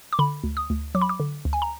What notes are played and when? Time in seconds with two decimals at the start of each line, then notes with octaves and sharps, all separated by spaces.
0.13 D6
0.19 D3 B5
0.44 D2
0.57 D#6
0.70 D2
0.95 F#3 D6
1.02 B5
1.09 D6
1.20 D3
1.45 D2
1.53 G#5
1.62 A#5